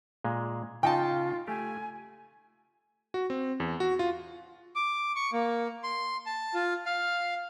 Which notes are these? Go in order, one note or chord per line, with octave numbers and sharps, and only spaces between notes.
A#2 G#3
C#3 D#4 F4 G5 A5
A3 G4 G#5
F#4
C4
E2
F#4
F4
D6
C#6
A#3
C6
A5
F4
F5